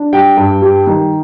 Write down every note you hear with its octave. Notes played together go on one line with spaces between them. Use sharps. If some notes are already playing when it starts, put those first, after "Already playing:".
Already playing: D4
G3 G5
G2
G3
D#3